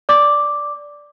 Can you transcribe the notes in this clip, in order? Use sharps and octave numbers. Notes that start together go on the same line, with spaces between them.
D5 D6